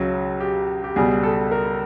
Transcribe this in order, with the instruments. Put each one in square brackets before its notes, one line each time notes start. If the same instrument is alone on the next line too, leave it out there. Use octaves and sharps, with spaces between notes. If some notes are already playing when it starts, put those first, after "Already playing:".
Already playing: [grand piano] C#2 C#3 F#3
G4
G4
C#2 B2 G3 G#4
A4
A#4